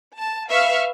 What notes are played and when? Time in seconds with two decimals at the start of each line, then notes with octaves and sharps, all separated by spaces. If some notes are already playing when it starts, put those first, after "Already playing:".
0.16 A5
0.49 B4 E5 F5 C#6 F6